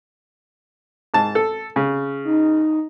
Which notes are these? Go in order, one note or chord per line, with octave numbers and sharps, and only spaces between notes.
G#2 A5
A4
C#3
D#4